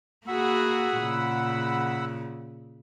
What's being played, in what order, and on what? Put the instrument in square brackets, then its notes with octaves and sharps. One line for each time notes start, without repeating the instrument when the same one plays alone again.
[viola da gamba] A#3 F#4 G#4 [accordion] F#5 B5 E6
[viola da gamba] A#2 C#3